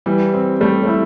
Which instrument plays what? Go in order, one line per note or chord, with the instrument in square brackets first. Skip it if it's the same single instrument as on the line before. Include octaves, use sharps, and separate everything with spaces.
[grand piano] E3 [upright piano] G3
[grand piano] C4
[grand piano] G3 [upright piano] A3
[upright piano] A3
[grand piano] E4